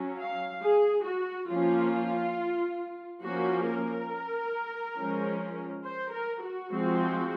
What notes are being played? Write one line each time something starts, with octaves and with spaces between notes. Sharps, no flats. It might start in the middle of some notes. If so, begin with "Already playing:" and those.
Already playing: F#3 C#4
F5
G#4
F#4
F3 A#3 C#4 F4
F3 A#3 C#4 F#4
A#4
F3 G#3 C#4
C5
A#4
F#4
F3 G#3 C4